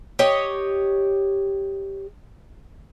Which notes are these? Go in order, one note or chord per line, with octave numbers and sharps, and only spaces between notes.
G4 C#5 D#5